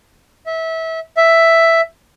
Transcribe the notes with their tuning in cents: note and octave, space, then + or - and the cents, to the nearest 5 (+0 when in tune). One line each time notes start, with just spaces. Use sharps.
E5 -25
E5 +5